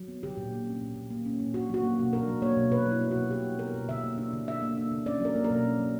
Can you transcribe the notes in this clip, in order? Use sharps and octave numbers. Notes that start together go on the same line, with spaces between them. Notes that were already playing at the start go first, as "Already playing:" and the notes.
Already playing: F#3
B3
D3 G4
A#2
A#3
C#4
A#2
A#2
A#3
C#4
A#2
D4 F#4
F#3 F#4
A#3
B2
D4 A#4
F#3
A#3 C#5
B2
B2 B4
F#3
E4
B3
B2 F#4
B2 G4
F#3
B3 A#4
B2
D3 E5
A#3
D4
D3
D3 E5
A#3
D4
D3
C#4 D5
F#3 A#4
A#3
A#4
B2
C#4
F#3